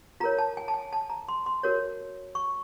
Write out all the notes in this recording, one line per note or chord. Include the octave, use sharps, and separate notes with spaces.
F4 A#4 C#5 A#5
A5
G#5
A5
G#5
A5
A#5
C6
C6
F#4 A#4 C#5
C#6